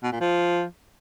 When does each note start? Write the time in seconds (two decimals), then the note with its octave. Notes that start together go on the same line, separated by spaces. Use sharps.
0.03 B2
0.12 A#2
0.21 F3